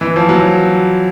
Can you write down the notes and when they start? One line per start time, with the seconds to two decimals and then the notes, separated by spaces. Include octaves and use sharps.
0.01 E3
0.16 F3
0.29 F#3